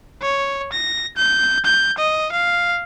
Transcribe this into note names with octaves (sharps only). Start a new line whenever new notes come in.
C#5
A#6
G6
G6
D#5
F5